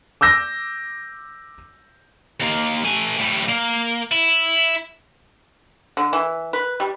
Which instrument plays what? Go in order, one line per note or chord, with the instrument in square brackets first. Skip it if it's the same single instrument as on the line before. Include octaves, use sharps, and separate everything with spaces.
[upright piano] D6 E6 G6 A#6
[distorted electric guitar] D#2 A#3
A3 G#5
A2 G3
A#3
E4
[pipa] D3
E3
B4
G3